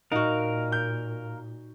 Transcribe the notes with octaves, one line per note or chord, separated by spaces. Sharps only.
A#2 D#4 F#4 A#4 D#5 F5
G6